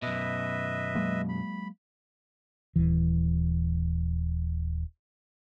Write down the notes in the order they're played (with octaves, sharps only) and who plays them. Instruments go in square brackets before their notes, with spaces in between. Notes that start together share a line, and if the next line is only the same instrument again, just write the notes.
[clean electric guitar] F#2 B2 [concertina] B4 D#5 E5
[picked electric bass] F#3 G#3 A#3
[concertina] B5
[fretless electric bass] D#1 E3